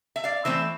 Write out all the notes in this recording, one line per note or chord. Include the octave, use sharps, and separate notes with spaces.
E5
D5 F5
E3 A3 C4 C5 E5